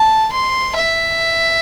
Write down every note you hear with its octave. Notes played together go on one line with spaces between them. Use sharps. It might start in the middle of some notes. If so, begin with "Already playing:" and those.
Already playing: A5
C6
E5